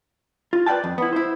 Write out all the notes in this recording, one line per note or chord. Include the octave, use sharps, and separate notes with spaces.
F4
B4 D5 F5 G5 A5
F2
B3 E4
E4 C5